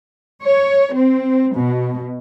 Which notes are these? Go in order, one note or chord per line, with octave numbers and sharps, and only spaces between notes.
C#5
C4
B2